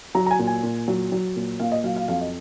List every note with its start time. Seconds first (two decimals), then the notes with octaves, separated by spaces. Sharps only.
0.15 F#3 A#5
0.26 A#5
0.31 G#5
0.39 A#2
0.47 G#5
0.63 A#2
0.88 F#3
1.12 F#3
1.36 A#2
1.60 A#2 F5
1.72 D#5
1.84 F#3 F5
1.96 F5
2.08 F2 F5
2.21 D#5